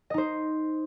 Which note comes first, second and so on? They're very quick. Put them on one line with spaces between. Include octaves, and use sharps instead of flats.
D#5 D#4 C5